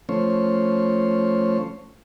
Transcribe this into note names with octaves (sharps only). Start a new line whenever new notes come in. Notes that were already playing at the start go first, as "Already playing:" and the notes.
F3 A3 C#4 C5 C#5